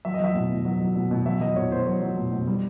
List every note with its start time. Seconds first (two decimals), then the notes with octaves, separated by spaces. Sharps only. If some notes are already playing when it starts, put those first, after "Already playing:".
0.05 F#3 E5
0.14 D#5
0.20 F#3 E5
0.35 B2
0.50 B2
0.65 F#3
0.81 F#3
0.95 B2
1.11 B2
1.26 F#3 E5
1.41 F#3 D#5
1.56 B2 C#5
1.71 B2 C5
1.86 F#3 C#5
2.02 F#3
2.17 B2
2.32 B2
2.47 G3